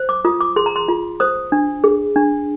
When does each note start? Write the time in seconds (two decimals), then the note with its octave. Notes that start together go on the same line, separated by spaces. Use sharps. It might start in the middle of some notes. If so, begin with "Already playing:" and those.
Already playing: C5
0.09 D6
0.25 F4 D#6
0.41 D6
0.56 G#4 C6
0.66 A#5
0.76 C6
0.88 F4
1.20 C5 D#6
1.52 D4
1.84 G#4
2.16 D4